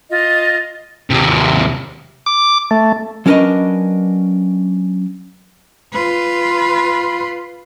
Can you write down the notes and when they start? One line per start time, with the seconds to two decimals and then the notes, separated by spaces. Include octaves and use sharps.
0.09 F4 D#5
1.10 D#2 C3
2.26 D6
2.71 A3
3.26 F#3 C#4 D4 A#4 B4 D#5
5.94 F4 B4